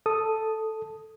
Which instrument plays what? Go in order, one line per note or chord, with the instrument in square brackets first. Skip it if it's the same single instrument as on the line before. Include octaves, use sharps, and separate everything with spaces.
[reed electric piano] A4 D#6